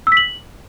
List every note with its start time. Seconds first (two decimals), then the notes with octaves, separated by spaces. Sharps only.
0.07 E6
0.12 B6
0.17 F#7